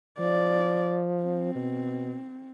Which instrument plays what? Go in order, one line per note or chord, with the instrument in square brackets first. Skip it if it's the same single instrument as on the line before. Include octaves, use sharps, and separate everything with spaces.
[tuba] F3 [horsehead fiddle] D5
[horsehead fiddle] C4
[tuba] B2